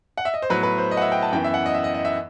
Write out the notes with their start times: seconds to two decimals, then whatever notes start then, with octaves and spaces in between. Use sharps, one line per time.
0.17 F#5
0.25 E5
0.34 D#5
0.42 C5
0.50 A2 F#3 B3 B4
0.63 B4
0.78 C5
0.91 D#5
0.97 F#5
1.02 E5
1.12 G5
1.23 A5
1.32 F#2 E3 B3 G5
1.44 E5
1.54 F#5
1.66 D#5
1.74 E5
1.84 D#5
1.94 D#5
2.05 E5